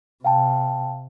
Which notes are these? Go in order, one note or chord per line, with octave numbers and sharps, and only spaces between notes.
C3 F5 G5 A5